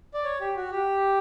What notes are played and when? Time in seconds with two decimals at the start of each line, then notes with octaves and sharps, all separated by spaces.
0.14 D5
0.24 C#5
0.41 G4
0.57 F#4
0.71 G4